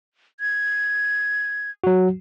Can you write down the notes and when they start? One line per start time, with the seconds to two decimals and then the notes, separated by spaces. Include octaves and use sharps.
0.40 G#6
1.84 F#3 F#4